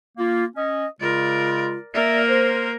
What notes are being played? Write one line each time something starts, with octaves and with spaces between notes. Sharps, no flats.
A#3 F4
C#4 D#5
C#3 G#3 F4 A#4 D5
A#3 A#4 D5 E5
C5